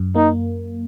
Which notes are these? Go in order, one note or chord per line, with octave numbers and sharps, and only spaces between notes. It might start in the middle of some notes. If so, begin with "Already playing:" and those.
Already playing: F#2
A#3 D#4